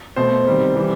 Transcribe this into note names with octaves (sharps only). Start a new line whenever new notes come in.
B2 A3 C5
C3 D#3 G3
C3 E3 G3